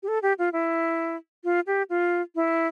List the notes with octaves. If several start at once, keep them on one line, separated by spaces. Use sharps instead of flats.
G4
A4
G4
F4
E4
F4
G4
F4
E4